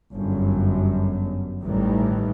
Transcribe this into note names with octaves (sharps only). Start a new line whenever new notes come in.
G1 F#2
A1 D#3 E3 G3